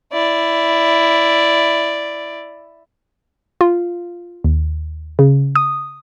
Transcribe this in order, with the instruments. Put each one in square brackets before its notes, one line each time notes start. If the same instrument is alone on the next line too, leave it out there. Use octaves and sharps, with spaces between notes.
[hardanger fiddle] E4 D5
[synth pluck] F4
D#2
C#3
D#6